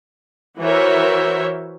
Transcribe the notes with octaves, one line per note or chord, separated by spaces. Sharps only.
E3 F#4 A#4 C5 C#5 E5